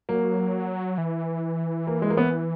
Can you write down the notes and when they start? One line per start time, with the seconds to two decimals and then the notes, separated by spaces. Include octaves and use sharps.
0.09 F#3 A#3
0.98 E3
1.87 A#3
2.02 G#3
2.10 A#3
2.17 B3